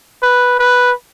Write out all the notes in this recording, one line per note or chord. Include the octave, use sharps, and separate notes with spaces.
B4
B4